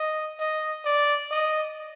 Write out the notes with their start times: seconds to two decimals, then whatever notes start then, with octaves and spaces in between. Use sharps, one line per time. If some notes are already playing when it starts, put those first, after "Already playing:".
Already playing: D#5
0.39 D#5
0.85 D5
1.31 D#5